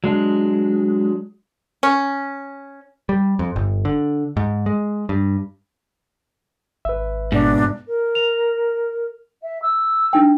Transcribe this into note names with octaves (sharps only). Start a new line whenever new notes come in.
F#3 G#3 D4
C#4
G3
F2
G1
D3
G#2
G#3
G2
G#1 B4 E5
G#2 B2 D4
A#4
F7
E5
E6
D4 D#4 G5